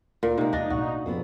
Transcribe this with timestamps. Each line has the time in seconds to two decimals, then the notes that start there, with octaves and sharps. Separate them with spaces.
0.23 D2 A#2 A#4
0.38 C3 G#3 A#3 D#4
0.53 E2 D4 D#5
0.70 B1 A2 F#4
1.06 F2 B3 E4 G#4